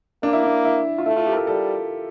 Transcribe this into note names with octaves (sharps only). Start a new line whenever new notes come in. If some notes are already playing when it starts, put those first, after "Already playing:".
A#3 D4
E4
D4
E4
F4
A3 E4
F4
G4
A#4
A4
G3 A4